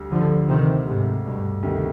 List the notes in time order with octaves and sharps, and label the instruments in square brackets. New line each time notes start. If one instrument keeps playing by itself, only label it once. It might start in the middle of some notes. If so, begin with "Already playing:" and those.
Already playing: [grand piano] D2 G3
[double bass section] D3 F3
C3 D#3
G#2 C3
G2 B2
[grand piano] D2 C3 D#3